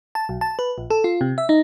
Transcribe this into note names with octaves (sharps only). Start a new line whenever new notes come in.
A5
B1
A5
B4
A#1
A4
F4
C3
E5
D#4